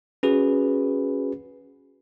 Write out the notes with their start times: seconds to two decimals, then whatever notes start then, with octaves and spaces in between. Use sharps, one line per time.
0.23 C#4 F#4 G#4 B4